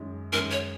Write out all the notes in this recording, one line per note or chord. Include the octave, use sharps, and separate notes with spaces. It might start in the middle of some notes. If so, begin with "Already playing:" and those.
Already playing: F#2 D#3 G#3
F#2 D#3 G#3 A#4
C#5